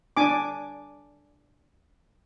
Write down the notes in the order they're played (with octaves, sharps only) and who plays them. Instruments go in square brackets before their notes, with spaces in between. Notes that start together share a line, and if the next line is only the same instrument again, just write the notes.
[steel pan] D4 G#5 D6